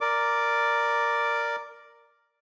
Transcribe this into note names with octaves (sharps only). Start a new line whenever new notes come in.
A#4 D5 D6